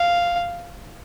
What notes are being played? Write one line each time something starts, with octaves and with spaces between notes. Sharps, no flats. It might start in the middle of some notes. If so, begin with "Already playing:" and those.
Already playing: F5